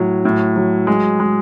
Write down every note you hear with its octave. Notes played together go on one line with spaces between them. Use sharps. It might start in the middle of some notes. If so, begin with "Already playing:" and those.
Already playing: A2 F#3
A2
F#3
G#3
G#3